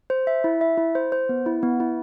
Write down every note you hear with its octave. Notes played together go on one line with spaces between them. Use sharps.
C5
E5
E4
E5
E4
C5
C5
B3
E4
B3
E4